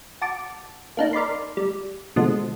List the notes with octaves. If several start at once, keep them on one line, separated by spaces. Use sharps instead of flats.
F#4 A5 D6
A#3 D4 D#4
A#4 D5 B5 C6
G3
B2 D3 F3 G#3